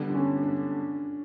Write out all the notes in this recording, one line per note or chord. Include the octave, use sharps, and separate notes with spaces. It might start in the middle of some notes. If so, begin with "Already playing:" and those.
Already playing: D3 G3 B3
D4
C#4
D4